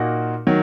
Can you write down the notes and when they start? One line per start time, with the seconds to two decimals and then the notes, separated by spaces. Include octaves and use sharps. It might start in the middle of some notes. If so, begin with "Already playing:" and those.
Already playing: A#2 A#3 D#4 F#4
0.47 D#3 F#3